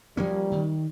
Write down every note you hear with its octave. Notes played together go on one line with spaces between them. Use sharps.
F3 G3 A#3 C#4
D#3